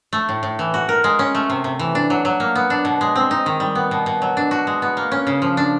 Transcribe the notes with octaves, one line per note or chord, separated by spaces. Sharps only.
A3
A2
A2
E3
F#4
A#4
G#3
C#4
A3
C3
C3
E3
D4
F#3
F#3
A#3
B3
D4
B2
G#3
C4
D#4
D#3
G3
B3
B2
B2
F#3
D4
F#4
G#3
B3
A#3
C#4
C#3
F3
D4